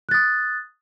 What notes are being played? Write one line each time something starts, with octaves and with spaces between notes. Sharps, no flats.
D#6 F#6 A6